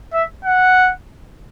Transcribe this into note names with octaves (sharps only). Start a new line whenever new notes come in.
E5
F#5